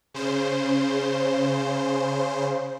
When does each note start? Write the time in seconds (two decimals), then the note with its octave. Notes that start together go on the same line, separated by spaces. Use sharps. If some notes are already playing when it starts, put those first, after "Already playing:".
0.14 C#3 C5